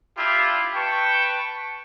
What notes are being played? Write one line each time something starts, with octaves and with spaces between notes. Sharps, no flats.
D4 E4 F4 G4
B4 G5 A5 C#6